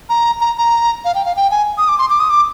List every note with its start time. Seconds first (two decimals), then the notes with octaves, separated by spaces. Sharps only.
0.09 A#5
0.41 A#5
0.57 A#5
1.05 F5
1.15 G5
1.25 F5
1.36 G5
1.51 G#5
1.78 D#6
1.88 D6
1.99 C6
2.10 D6
2.20 D#6
2.30 D6